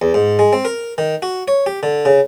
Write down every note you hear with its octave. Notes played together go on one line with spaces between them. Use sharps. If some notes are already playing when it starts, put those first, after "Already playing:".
E2
G#2
G#3
C4
A#4
D#3
F#4
C#5
G4
D3
C#3